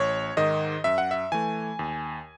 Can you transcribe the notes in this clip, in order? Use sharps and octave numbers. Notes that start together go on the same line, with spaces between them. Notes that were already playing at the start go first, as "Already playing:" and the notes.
Already playing: A1 C#5
G#2 D#3 D#5
F#2 E5
F#5
E5
E3 A3 G#5
D#2